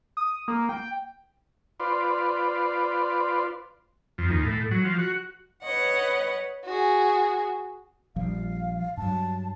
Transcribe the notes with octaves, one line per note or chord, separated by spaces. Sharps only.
D#6
A#3
G5
F4 B4 C5 D5
F2
D#2
A2
F#3
F3
F#4
B4 C#5 D#5 F#5
F#4 G#4
A#1 F3 G3 F5
G2 F#3 A5